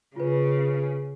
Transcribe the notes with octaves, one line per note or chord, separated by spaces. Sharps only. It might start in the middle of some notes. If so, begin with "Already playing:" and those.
C#3 F4 B4